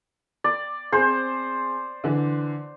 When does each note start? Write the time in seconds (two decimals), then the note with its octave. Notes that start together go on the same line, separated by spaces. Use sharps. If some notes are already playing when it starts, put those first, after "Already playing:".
0.44 D5
0.92 C4 G#4 C5
2.04 D3 E3